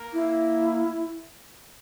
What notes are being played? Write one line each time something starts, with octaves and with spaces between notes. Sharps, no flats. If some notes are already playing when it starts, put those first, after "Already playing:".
Already playing: A#3
E4